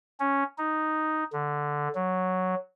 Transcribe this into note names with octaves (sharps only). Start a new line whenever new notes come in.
C#4
D#4
D3
F#3